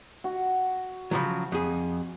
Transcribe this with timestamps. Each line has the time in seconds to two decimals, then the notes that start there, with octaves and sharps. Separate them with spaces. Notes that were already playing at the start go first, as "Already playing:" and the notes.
0.24 F#4
1.11 C#3 F3 F#3
1.52 F2 G#4